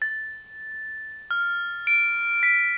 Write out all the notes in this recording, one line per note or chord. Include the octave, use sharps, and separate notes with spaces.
A6
F6
D7
B6